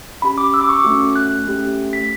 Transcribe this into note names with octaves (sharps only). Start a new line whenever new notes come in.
C#4 G4 B5
D6
E6
D6
C#6
D6
A3 C#4 F#4
F#6
A3 C#4 G4
B6